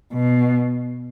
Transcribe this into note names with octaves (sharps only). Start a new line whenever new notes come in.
B2